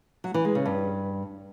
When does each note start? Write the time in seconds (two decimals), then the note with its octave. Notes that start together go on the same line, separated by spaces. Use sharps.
0.24 F#3
0.34 E3
0.45 G#3
0.55 C#3
0.66 G2